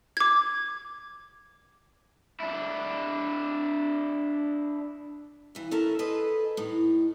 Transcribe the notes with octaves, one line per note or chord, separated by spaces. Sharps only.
D6 G#6
D4 E4
G2 E3
C#4 E4 A4 A#4
G#4 A4 B4 C5 D#5
A2 D#4